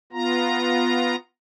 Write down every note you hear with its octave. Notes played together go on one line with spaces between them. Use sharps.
B3 F4 A#5